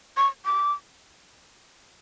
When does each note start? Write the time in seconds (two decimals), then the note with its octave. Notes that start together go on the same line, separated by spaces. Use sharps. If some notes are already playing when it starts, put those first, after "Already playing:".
0.17 C#6
0.46 D6